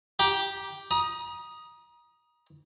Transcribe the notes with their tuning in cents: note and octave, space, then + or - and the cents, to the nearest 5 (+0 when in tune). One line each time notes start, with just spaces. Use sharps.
G4 +0 A#5 +30 D6 +0
A#5 +35 D#6 +0